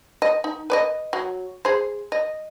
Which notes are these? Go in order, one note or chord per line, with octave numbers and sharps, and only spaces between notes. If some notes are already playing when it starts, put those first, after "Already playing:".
D#5
D#4
B4 D5 D#5
F#3
G#4 C5
D#5